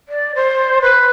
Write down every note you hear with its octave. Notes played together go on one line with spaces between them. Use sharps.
D5
C5
B4